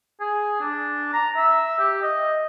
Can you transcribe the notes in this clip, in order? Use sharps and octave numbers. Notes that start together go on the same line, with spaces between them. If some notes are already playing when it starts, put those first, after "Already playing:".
G#4
D4
A#5
E5
G4
D#5